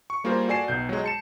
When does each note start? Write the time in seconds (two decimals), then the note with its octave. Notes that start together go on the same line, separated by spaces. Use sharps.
0.10 C#6
0.24 G3 A#3 F4 G#4 A#4 C5
0.48 F#4 A4 D5 G#5 C7 E7
0.68 B1 B2 G6
0.89 F#3 G#3
1.04 A5 C#7 E7